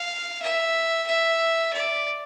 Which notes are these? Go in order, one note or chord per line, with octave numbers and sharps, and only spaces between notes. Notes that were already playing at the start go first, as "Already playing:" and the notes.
Already playing: F5
E5
E5
D5